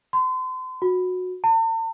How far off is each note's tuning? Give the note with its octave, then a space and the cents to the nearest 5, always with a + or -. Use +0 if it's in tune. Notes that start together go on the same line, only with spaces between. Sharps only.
C6 -35
F#4 -20
A5 +45